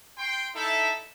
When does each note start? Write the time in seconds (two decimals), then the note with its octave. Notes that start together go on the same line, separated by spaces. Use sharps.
0.18 G5 C6
0.54 D#4 E4 A4 E5